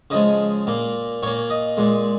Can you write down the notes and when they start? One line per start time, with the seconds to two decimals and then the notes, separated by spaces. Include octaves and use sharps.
0.10 C#3 F3 G#3 D#5
0.67 A#2 A#3
1.22 A#2 A#3 C#5
1.50 D#5
1.77 A#2 G#3